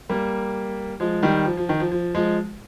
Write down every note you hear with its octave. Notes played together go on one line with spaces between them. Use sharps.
G3 A#3
F3 G#3
D#3 G3
F3
F3
D#3
F3
F3
F3 G#3